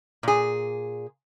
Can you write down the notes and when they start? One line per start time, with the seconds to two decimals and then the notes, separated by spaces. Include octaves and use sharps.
0.23 A#2 G#4